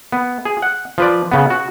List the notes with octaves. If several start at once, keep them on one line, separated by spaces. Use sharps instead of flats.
B3
G#4
F#5
F3 B4 D5
C#3 B3
F#4